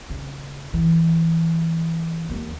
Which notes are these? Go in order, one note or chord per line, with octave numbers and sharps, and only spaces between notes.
C#3
E3
D#2 D#4